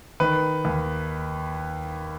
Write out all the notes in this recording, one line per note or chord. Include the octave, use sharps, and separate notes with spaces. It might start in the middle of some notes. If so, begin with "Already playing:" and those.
D#3 B4
D#2